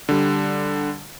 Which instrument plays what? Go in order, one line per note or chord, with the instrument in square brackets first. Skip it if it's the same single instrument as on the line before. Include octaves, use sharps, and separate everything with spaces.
[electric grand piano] D3 G3